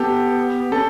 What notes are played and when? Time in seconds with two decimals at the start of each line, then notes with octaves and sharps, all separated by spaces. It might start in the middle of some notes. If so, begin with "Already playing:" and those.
Already playing: B3 G4 A4
0.72 C#4 A4